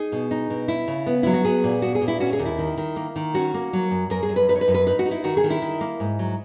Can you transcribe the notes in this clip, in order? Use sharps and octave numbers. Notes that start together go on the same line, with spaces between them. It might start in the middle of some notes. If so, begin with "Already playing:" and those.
Already playing: D#4 G#4
B2
D#4
B2
E4
C#3
B3
F#3 E4
F#4
B3 G#4
A#2
B3 F#4
G#4
A#2
E4
C#4 F#4
G#4
D#2
E4
D#3
D#3
A#3
D#3
C#4 F#4
A#3
F#3
F#2
F#2 A#4
G#4
F#2
B4
D#4 B4
C#5
B4
F#2
B4
D#4 B4
F#4
D#4
E4
D#3 F#4
G#4
D#3
E4
D#3
A#3
G#2
F#3